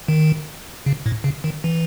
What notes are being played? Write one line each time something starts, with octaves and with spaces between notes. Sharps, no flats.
D#3
C#3
A2
C#3
D#3
E3